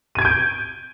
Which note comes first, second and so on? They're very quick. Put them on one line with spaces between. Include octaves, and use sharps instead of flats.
D#7 G#6 D7 G6